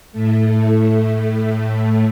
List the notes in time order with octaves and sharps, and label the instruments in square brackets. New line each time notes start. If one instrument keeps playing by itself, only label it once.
[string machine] A2 A3